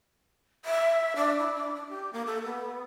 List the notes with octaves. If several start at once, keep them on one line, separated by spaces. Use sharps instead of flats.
E5
D4
E4
D4
D4
G4
A#3
A4
B3